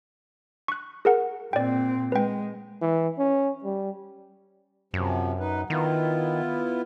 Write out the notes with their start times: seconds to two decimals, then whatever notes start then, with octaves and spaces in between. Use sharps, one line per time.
0.68 C#6 F#6
1.05 G#4 A#4 F#5
1.53 A#2 C4 D5 G5
2.12 G#3 B4 G5
2.81 E3
3.18 C#4
3.64 G3
4.94 F#2 C3 F3
5.40 D#4 B4
5.70 D#3 B3 E4 F4